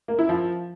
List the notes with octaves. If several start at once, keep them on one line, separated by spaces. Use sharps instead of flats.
A#3
E4
F3